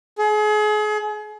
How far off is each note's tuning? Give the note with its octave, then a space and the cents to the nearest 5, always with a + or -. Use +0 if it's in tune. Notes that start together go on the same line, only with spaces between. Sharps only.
G#4 +35